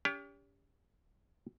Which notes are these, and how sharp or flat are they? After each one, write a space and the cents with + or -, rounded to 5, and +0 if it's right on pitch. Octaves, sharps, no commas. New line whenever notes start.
C#4 +45 G4 +25